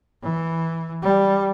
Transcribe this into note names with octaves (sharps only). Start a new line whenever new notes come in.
E3
G3